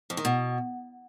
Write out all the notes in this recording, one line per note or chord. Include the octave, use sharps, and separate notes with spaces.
F2
D#3
B2